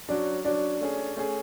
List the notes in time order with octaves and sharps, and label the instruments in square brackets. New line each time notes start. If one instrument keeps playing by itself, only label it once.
[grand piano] F#3 C#4 F#4 [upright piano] D4
[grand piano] F#3 C#4 F#4 [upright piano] D4
[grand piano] A3 C#4 G#4
A3 C#4 G#4